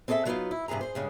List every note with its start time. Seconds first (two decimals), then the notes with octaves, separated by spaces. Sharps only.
0.08 C4 G#4 A4 D#5 E5 A5
0.25 D3 F#3 A#3 B3 D#4 F4
0.51 E4
0.68 G2 C3 D#3 G#4 A#5
0.81 G#4 C5
0.95 G2 C#3 G#3 C#4